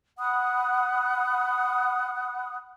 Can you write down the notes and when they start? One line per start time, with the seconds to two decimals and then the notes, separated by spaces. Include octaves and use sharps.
0.19 F#5 B5 D#6 F#6